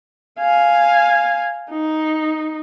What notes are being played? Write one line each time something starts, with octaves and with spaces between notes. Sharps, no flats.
F5 G#5
D#4